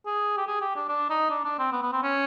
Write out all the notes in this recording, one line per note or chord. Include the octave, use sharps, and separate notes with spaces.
G#4
G4
G#4
G4
D4
D4
D#4
D4
D4
C4
B3
B3
C4
C#4